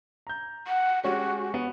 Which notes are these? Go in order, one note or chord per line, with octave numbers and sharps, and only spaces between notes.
A#5 G6
F#5
G#3 C#4 F#4 G4
B3